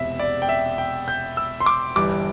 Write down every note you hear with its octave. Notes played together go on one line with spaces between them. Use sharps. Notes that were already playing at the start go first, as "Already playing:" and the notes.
Already playing: E1 E2 C3 E5
D5
G5
E5
G5
G6
E6
C6
D6
G1 G2 E3 G3 D6